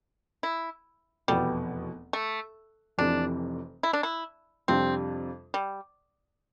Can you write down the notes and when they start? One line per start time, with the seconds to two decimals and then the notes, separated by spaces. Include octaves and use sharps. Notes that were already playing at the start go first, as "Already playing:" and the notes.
0.43 E4
1.28 F1 E2 B2 G3 B3
2.13 A3
2.98 F1 F2 C3 E3 D4
3.83 E4
3.93 D4
4.03 E4
4.68 F2 C3 G3 C4 D4 F4
5.54 G3